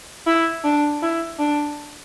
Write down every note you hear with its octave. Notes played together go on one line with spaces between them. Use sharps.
E4
D4
E4
D4